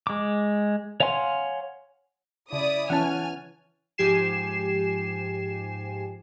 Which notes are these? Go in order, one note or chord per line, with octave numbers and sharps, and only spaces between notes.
G#3 D6
C#5 F5 F#5 G#5 C6
C#3 E4 D5 D#6
E3 C#4 F#5 G#5 A5 F6
G#2 F3 G4 G#5 C7 E7